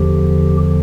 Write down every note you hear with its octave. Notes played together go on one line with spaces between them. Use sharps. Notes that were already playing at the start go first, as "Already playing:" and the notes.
Already playing: E2 D3 F3 G4